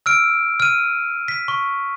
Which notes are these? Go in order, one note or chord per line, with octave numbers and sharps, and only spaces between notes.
E6 F6 D7
F6 D#7
B6
C#6